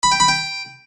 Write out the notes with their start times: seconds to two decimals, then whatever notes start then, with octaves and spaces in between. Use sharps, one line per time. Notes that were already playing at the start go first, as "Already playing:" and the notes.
0.03 B5
0.12 G5
0.20 B5
0.28 G5